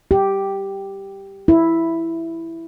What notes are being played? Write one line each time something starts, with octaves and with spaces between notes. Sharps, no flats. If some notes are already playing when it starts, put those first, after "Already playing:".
G4
E4